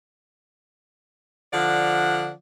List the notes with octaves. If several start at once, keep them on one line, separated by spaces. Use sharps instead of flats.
D3 F3 D5 F#5